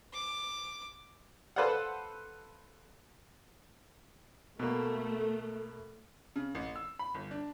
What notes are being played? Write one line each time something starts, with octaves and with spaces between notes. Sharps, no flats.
D6
A4 B4 C5 D5 F5 F#5
B2 A3 A#3
C#3
A1
E6
B5
G1
D4